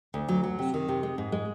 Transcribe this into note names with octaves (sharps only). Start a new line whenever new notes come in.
D2
F#3
F#3
C3
D#3
C3
G#3
G#2
G#3